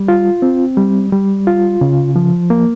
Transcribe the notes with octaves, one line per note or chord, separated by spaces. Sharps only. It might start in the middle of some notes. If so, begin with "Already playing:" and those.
Already playing: G3
F4
C4
G3
G3
F4
C#3
F3
A#3